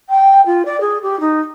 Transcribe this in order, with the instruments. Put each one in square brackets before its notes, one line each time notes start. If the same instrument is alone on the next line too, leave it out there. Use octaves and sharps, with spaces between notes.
[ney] G5
F4
D5
G#4
G4
D#4